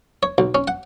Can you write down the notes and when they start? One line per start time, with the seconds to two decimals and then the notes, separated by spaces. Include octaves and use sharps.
0.23 C#5
0.38 B1
0.55 C#4
0.68 F#5